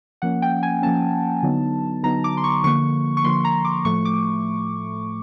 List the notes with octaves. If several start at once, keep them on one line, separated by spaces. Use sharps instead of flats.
F3 A#3 C#4 F#5
G5
G#5
F3 A#3 C#4 A5
D3 F#3 B3 D#4
D3 F#3 B3 D#4 A#5
D6
C6
C#6
D3 F3 A#3 C#6
C#6
D3 F3 A#3 C6
A#5
D6
A2 F3 A3 C#6
D6